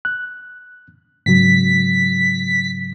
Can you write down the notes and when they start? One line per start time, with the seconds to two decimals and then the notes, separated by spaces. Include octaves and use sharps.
0.05 F#6
1.26 G#2 C#3 F#3 B6